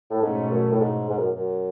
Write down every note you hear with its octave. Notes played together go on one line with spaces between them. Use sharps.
A2
G#2 B2 A3 C#4
F#2
A2
G#2
G#2
F#2
F#2